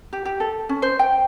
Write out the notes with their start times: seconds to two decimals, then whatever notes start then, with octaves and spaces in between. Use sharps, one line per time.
0.13 G4
0.25 G4
0.40 A4
0.69 C#4
0.82 C5
0.99 G5